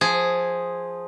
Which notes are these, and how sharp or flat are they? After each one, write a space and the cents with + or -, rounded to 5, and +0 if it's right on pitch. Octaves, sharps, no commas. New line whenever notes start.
F3 +0 G#4 -5